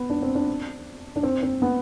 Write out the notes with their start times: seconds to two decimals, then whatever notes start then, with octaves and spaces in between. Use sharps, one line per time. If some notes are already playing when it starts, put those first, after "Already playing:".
Already playing: B3
0.10 D4
0.22 C4
0.35 D4
1.16 D4
1.23 C4
1.43 C4
1.62 B3